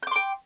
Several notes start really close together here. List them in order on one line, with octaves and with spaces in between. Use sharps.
G6 D6 C6 G5